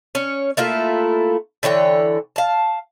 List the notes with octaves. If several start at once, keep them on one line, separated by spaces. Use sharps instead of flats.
C#4 C#5
A3 A#3 E4 F4
D3 E3 C#5 G5
F5 A5